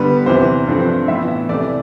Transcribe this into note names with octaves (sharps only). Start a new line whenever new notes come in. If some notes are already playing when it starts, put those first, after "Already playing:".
Already playing: G2 D3 G3 B3 B4
E2 C3 E3 C5
G2 F3 A3 C4
A2 E3 B3 E5
C2 C3 E3 A3 D5